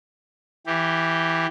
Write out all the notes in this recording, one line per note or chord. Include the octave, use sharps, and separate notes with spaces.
E3 G4